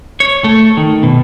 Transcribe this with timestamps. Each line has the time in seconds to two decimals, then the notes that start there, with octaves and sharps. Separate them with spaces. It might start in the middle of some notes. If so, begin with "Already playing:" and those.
0.20 C#5
0.44 A3
0.77 D#3
1.03 B2